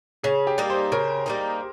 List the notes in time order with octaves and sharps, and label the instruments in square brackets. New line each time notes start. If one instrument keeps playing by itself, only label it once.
[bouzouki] C#3 [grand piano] G#4
[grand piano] G4
[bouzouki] G3 A#3 D#4
[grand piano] C5
[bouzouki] C#3 [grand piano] A#4
[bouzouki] G3 A#3 D#4